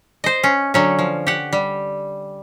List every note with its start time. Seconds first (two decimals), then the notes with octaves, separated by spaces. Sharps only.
0.24 C5 D#5
0.44 C#4
0.74 D3 F#3 C#4
0.99 F3
1.27 G4 F#5
1.53 G3